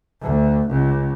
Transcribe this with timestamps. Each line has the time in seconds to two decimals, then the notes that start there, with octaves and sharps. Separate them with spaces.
0.22 D2
0.69 C#2